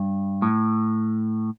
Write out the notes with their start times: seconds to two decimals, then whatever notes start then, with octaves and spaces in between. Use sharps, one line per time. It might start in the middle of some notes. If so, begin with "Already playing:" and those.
Already playing: G2
0.42 A2